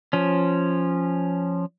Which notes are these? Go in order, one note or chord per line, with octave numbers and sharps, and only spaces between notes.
F3 C#4